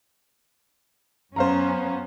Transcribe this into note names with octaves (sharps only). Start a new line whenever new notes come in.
F#2 B3 C#4 C5 F5 A#5